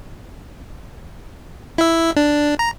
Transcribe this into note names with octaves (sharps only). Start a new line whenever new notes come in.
E4 E5
D4
A#5